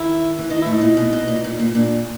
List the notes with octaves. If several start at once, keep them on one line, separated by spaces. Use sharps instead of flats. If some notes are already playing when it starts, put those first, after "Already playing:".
Already playing: D#3 E4
E3
D#3 D#4
A2 E4
D#4
A#2
B2
B2
A#2
A#2
A#2
A#2 D4